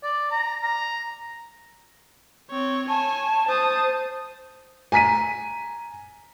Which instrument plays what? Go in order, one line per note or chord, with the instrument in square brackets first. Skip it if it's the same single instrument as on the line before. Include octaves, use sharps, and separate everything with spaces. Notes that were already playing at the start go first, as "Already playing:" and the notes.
[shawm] D5
A#5
A#5
[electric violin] C4 C#5
[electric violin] C#5 G#5 [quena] A5
[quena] C5 [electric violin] A5 D#6
[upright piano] G#5 A#5 B6 D#7